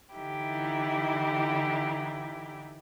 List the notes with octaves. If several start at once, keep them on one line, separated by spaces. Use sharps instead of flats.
D3 E3 D#4 E4 G4